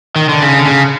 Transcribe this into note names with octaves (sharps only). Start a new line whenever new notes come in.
D#3
D3
C#3
D3
C#3